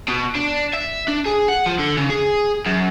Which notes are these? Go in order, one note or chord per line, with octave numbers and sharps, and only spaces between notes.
B2
D4
E5
D4
G#4
F#5
F3
D3
C#3
G#4
F#2